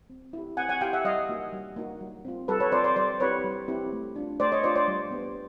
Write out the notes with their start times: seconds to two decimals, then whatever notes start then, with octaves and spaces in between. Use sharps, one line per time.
0.10 C4
0.33 E4 G4
0.57 C4 F#5 G#5
0.69 F#5 G#5
0.81 E4 G4 F5 G5
0.93 E5 F#5
1.05 G3 D#5 F5
1.29 A#3 D#4 F#4
1.53 G3
1.76 A#3 D#4 F#4
2.01 G3
2.25 C4 F4
2.48 G3 A4 B4
2.60 B4 C#5
2.72 C4 F4 C5 D5
2.84 C5 D5
2.96 G3 C5 D5
3.20 C4 E4 G4 B4 C#5
3.44 G3
3.68 C4 E4 G4
3.92 A3
4.16 D4 F4
4.40 A3 C5 D5
4.52 C#5 D#5
4.64 D4 F4 C5 D5
4.76 C5 D5
4.88 G3
5.11 B3 D4 G4